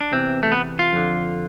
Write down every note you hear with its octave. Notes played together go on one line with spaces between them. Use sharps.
D4
E2 C3 E3 C4
A3
B3
F4
F2 D3